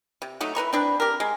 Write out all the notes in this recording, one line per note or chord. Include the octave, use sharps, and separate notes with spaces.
C3
F#3 A3 D#4
E4 B4 A#5 C#6
C4 D4 B4
G4 A#4
G#3